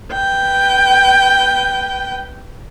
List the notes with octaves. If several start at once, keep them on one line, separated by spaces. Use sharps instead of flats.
B4 G5